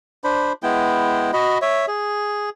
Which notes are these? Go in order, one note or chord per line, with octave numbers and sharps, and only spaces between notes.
D4 C5 B5
G#3 B3 E4 G5
F#4 D#5 B5
C#5 E5
G#4